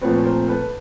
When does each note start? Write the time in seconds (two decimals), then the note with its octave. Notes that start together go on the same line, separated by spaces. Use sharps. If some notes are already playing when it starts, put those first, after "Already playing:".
0.01 A#2 F3 A3 C4 B4 C#5
0.25 A#4 C5
0.48 A4 B4